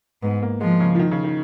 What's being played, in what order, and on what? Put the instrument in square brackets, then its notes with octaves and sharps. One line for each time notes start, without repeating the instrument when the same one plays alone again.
[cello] G#2 [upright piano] B3
[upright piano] A#3
[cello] F3 [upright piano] G#3
[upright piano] C#3
F3
D#3
C#3
D#3